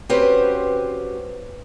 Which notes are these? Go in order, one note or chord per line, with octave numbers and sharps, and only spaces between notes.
C4 C#4 F#4 G4 B4 C5